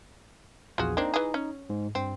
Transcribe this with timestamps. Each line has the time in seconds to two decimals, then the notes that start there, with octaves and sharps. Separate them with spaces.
0.78 A#1 E2 F4 F#4 G#4
0.97 A#3 C4 D4 D#4
1.14 E3 G#4
1.34 C#4
1.70 G#2
1.95 G2 C4